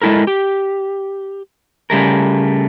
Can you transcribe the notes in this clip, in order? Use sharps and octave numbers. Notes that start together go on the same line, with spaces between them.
G#3 A3 E4 A4 A#4
G4
C#3 G3 A3 A#4